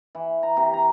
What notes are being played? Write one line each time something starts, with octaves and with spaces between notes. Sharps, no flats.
E3
A#5
C3
A#5